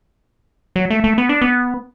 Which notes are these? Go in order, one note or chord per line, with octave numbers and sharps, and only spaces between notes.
F#3
A3
A3
B3
D4
B3